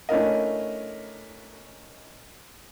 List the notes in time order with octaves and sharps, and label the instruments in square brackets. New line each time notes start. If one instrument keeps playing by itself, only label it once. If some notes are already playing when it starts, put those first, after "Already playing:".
[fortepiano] A3 C#4 D4 E4 A#4 D#5